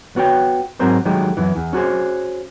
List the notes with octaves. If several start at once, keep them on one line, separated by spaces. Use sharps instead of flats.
B3 F#4 C#5 G5
G#2 F#3 C4 A#4 C5
D#3 F#3 G#3 A3 G4
F#2 E3
E2
C#4 F#4 G#4 C5